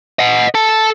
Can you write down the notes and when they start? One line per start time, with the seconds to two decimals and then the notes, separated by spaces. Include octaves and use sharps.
0.19 D#5 F#5
0.54 A4 A5